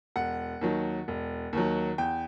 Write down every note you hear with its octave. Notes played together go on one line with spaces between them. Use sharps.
E1 F#5
D#2 D#3 F#3
E1
D#2 D#3 F#3
E2 G5